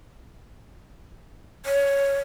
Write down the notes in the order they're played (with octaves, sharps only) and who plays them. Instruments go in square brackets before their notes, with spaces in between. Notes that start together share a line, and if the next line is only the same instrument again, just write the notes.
[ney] C#5